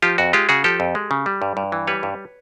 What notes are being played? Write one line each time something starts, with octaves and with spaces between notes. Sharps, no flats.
F3 F4 G4
F2 F#4
G#3 F4 G4
C#3 F#4 G#4
F3 G4 A4
F2
G#3
C#3
G3
G2
G2
E3
G3 B4 C#5
G2